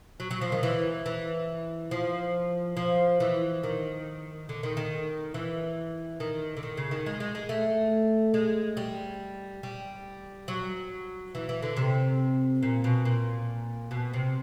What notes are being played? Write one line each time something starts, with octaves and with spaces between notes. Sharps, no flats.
F#3
F#3
F3
D#3
E3
E3
F3
F3
E3
D#3
D3
D#3
D#3
E3
D#3
D3
D#3
C#3
D#3
G#3
G#3
G#3
A3
G#3
G3
G3
F#3
E3
E3
D3
C3
A#2
B2
A#2
B2
C3